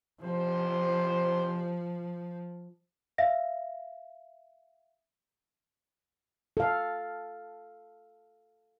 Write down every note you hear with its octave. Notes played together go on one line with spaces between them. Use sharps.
A1 C3 F3 C5
E5 F5 A#6
A4 F5